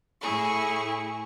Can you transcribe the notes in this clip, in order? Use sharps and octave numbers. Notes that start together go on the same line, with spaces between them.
A2 E4 G#4 C#6